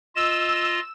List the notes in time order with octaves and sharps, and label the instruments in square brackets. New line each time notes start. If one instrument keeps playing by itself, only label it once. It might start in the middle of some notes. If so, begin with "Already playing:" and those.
[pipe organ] F4 D#5 [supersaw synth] E6 E7